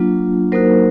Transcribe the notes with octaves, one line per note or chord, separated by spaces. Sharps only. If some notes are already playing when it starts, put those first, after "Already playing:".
Already playing: F#3 A#3 D4 F4
F#3 A#3 D#4 F#4 A#4 C5